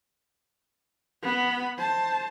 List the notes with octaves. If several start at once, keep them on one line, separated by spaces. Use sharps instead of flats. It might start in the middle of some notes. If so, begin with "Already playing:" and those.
B3 B5
C5 A5